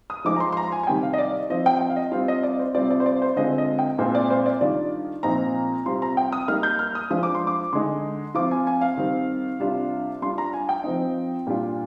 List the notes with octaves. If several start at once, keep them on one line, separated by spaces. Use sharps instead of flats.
D#6
F3 G#3 D#4 D6
A#5
C6
C6
A#5
G#5
G#5
C3 D#3 G3 G5
F5
D#5
D5
F3 C4 F4 D#5
G5
G5
F5
D#5
G3 C4 F4 F5
D#5
D5
C5
C3 G3 C4 F4 D5
D5
C5
D5
C5
D3 G#3 C4 F4 D#5
D#5
G5
A#2 G#3 C4 F4 C5
D5
C5
D5
D#3 G3 D4 F4 D5
A#2 F3 C4 D#4 A#5
C3 G3 C4 F4 C6
A#5
G5
D#6
G3 A#3 D#4 F6
G6
F6
D#6
F3 G#3 D4 F4 D#6
D6
C6
D6
D3 G#3 D#4 C6
F3 C4 F4 D6
G#5
G#5
F5
D#3 G3 C4
C3 G3 D4 F4
G3 D4 F4 C6
A#5
G#5
G5
F3 C4 D#4
A#2 G3 D4 F4